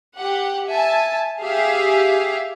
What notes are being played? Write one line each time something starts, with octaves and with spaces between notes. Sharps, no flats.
G4 F#5
E5 G#5 A5
G4 G#4 E5 F5